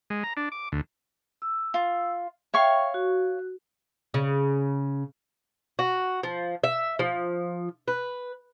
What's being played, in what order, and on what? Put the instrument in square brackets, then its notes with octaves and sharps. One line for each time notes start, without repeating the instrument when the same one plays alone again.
[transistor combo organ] G#3
A#5
D4
D6
D2
[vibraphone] E6
[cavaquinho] F4
[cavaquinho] C#5 F5 C#6 [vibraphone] E5 G5
[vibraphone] F#4
[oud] C#3
[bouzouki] F#4
F3
E5
F3
B4